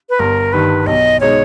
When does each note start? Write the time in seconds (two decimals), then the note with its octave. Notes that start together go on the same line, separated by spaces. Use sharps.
0.09 B4
0.19 G1 A#4
0.53 G2 D#3 B4
0.87 B1 D#5
1.20 B2 G#3 D#4 C#5